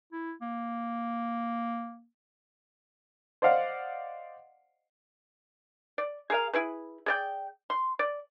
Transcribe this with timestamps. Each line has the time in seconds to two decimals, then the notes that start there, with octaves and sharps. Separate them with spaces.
0.13 E4
0.42 A#3
3.42 C5 D5 D#5 F5 F#5
5.98 D5
6.30 G#4 A#4 F5
6.53 E4 G#4 B4
7.06 G#4 D5 G5
7.70 C6
7.99 D5